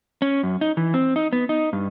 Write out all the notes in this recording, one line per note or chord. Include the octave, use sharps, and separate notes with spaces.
C#4
F#2
D#4
E3
C4
D#4
B3
D#4
G2